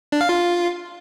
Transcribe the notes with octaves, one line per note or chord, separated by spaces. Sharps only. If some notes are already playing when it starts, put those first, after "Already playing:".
D4
F5
F4